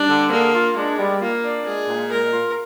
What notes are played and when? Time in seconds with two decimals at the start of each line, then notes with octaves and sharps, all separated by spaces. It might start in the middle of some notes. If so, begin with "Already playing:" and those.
Already playing: G3 D4
0.09 D3
0.31 A#3 G#4
0.54 F4
0.76 G#3 D4
0.98 G3
1.22 A#3 F4
1.44 D4
1.66 G#3 G#4
1.89 A#2
2.11 G#3 A#4
2.33 F4